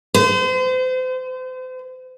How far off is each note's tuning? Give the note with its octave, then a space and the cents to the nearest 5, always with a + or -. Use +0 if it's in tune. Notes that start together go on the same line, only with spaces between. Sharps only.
C5 -35